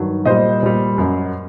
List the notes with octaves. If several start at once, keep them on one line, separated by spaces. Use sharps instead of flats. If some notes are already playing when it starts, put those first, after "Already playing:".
Already playing: G2 D#3 F#3
A#2 G3 C5 D#5
A#2 G3
F#2 F#3